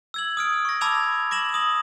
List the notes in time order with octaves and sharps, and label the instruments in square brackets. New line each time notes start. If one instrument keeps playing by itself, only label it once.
[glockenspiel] E6 G#6 F#7
D#6 F6 D7
C#6 A#6
A5 B5 D6 E6 G#6 F7
D6 A#6 E7 F#7
D#6 F#7